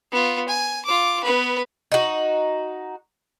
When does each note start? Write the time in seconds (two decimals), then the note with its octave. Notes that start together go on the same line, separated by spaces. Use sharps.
0.12 B3 F4
0.48 G#5
0.85 F4 D6
1.24 B3 B4
1.92 D#4 F#4